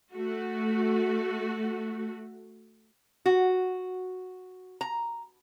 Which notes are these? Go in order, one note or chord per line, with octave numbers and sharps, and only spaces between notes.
A3 F#4
F#4
A#5